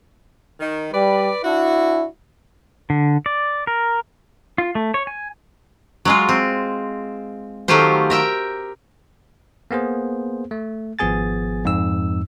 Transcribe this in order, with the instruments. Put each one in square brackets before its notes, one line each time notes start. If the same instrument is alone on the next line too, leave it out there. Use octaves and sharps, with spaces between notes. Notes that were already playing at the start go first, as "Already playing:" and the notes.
[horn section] D#3
[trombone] G3 [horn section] B4 D5
[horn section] D4 F#4 [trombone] E4
[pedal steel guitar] D3
D5
A#4
F4
A3
C#5
G#5
[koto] F#3 G#3 F4
C4
D#3 F#3 A3 F4 G4 C5
A#4 E5 G5
[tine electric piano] A#3 B3 G#4 C5
A3
G#1 F3 B3 G#4 G#5 A6
F2 G#2 D#4 E6